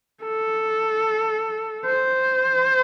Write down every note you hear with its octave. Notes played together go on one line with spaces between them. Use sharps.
A4
C5